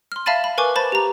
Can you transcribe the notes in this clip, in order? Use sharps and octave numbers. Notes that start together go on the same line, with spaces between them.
C6 F6
E5 F5 A5 B5 A6 D#7
B5
A#4 B4 G#5 C#6 D6
C5 A5 B5 A6
G4 A#5